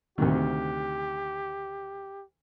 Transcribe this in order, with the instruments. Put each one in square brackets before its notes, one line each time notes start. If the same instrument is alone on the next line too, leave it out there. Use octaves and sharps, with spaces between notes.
[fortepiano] D2 C3 D#3 [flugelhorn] G4